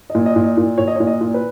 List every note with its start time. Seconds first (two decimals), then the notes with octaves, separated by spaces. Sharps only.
0.10 D#5
0.15 A#2
0.26 D#5
0.36 A#2
0.44 D#5
0.57 A#2
0.78 A#2 C#5
0.88 D#5
0.96 C#5
1.00 A#2
1.07 D#5
1.21 A#2
1.34 B4